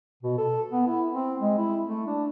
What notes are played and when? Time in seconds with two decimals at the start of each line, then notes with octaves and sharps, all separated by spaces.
0.22 B2
0.38 A4
0.72 B3
0.87 E4
1.11 C4
1.40 G#3
1.58 E4
1.85 A3
2.07 D4